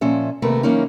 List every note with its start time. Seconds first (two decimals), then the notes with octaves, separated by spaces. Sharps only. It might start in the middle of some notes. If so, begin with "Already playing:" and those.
0.01 A#2 F3 C#4 E5
0.42 D#2 C3 A3 A#4 B4
0.63 E3 F#3 A#3 C#4 D#4